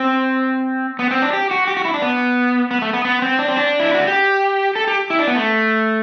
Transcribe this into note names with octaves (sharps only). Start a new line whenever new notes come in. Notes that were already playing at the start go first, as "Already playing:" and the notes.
Already playing: C4
B3
C4
D4
G4
F#4
G4
F#4
E4
D4
B3
B3
A3
B3
B3
C4
D4
C4
D4
E4
F#4
G4
A4
G4
E4
D4
B3
A3